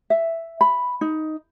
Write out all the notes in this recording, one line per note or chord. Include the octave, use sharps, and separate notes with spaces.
E5
B5
D#4